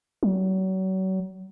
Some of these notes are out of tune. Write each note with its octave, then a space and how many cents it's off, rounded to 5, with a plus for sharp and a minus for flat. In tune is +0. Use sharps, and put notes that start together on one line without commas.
F#3 +35